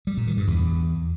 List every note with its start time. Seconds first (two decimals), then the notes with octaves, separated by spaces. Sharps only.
0.07 G3
0.17 A#2
0.27 D#3
0.37 G2
0.47 E2